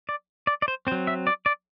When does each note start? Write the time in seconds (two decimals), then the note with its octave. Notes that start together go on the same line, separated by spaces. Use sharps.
0.09 D5
0.47 D5
0.62 D5
0.68 C5
0.87 C4 C5
0.92 F#3
1.07 E5
1.27 D5
1.46 D5